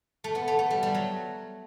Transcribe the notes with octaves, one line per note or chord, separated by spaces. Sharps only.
A3
B3
A3
A3
G3
G3
F#3